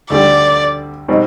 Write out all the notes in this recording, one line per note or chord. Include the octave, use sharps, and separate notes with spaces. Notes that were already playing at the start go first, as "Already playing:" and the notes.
D2 D3 G3 D5
B2 G3 C4 D#4